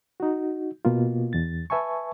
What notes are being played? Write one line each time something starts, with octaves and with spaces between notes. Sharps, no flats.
D#4 F#4
B2 A#3 F4
E2 A6
B4 E5 G#5 A5 C#6